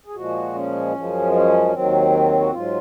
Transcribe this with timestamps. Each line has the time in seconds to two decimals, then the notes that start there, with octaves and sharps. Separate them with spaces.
0.06 G#4
0.15 A#2 F3 G#3 F#4
0.54 C#4
0.94 F#2 F3 G#3
1.33 C#4
1.72 D#2 D#3 F#3 C4
2.39 F#4
2.51 G#2 F#3 F4